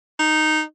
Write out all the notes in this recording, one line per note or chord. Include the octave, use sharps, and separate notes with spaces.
D#4